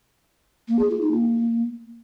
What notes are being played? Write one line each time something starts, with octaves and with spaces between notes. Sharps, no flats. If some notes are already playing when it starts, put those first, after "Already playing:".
A#3
G#4
F4
D#4
A#3